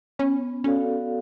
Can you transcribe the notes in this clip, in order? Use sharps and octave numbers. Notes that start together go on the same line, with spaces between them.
B3 C#4
C#4 F#4 A4 D5 F5